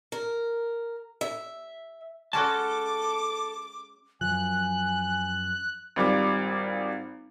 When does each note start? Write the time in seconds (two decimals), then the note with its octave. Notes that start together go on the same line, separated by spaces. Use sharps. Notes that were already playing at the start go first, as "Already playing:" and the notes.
0.12 A#4
1.21 E5
2.33 G#3 C#4 F#4 A4 A5 D6
4.21 F#2 F3 G#5 F#6
5.96 G#1 G3 F4 D6